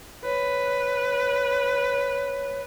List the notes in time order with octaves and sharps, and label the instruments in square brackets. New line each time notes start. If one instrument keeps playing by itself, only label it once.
[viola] B4 [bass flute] C#5